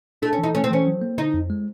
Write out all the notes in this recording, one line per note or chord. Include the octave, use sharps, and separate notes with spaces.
A3 D4
C#4
E3 D#4
A3 C#4
C4
E3 C#4
F#3
A#3
D3 D#4
F2
G#3